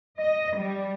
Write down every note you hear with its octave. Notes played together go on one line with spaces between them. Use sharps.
D#5
G3